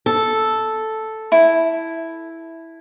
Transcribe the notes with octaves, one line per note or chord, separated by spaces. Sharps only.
A4
E4